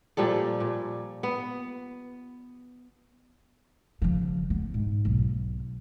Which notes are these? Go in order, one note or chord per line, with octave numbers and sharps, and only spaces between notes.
A#2 F3 G3 A4
A#2
B3
C#3 F3
B3
G#2
B1